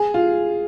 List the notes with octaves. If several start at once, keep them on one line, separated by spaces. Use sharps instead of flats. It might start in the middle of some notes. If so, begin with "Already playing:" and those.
Already playing: G#4
F4